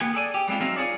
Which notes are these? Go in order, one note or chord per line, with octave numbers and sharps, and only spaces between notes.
A#3 B3 G4 G#5
G#4 A4 D5 G#5
G4
G3 G#3 C4 E4 F4
F#3 C4 D#4 A#4 E5 F5
F4 G#4 A4 C#5 D5